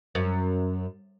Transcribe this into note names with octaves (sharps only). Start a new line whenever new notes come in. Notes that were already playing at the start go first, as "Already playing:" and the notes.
F#2